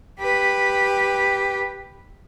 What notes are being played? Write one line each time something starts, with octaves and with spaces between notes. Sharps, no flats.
G4 B4